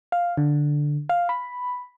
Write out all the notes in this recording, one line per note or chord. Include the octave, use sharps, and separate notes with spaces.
F5
D3
F5
B5